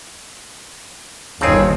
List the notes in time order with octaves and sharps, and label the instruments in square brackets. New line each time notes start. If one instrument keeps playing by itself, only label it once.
[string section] G1 D#2 [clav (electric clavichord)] C#3 C4 G#4 [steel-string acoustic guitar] C#5 A5